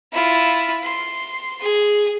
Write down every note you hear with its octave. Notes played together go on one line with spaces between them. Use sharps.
E4 F4
C6
G#4